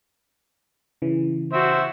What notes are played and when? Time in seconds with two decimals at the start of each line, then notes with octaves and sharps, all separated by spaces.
1.02 C#3 E3
1.53 F#4 C5 E5